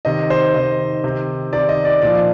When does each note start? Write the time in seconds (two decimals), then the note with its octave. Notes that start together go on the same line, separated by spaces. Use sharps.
0.05 C3 D#3 D#5
0.30 C5
0.54 C3 D#3 D#5
1.04 C3 D#3
1.53 C3 D#3 D5
1.69 D#5
1.85 D5
2.02 A#2 F3 D5